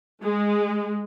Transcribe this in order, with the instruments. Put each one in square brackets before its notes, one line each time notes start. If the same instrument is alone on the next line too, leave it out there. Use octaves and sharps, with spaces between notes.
[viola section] G#3